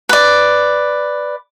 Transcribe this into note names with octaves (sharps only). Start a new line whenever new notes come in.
B4 D5